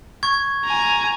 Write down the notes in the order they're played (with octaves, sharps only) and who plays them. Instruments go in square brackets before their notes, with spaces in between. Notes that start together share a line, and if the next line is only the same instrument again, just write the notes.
[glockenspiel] C#6 G#6
[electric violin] G#5 A#5